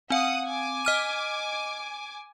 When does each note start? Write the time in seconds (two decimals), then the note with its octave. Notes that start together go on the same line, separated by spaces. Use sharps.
0.10 C4 F5 F#5 D#6
0.48 G#5 D6
0.85 D#5 F6 D#7